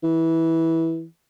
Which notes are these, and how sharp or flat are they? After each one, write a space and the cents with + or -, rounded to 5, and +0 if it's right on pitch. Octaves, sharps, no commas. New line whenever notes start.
E3 -15